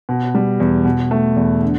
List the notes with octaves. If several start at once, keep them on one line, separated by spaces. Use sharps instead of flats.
B2
G3
E2
B2
A3
E2
D3